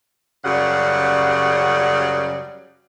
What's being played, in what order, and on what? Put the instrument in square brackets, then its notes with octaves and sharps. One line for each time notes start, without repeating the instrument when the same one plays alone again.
[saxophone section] F#2 C#3 G3 D5 F#5